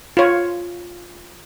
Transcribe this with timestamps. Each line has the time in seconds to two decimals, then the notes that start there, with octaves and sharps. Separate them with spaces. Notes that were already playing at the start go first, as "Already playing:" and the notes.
0.17 F4 C#5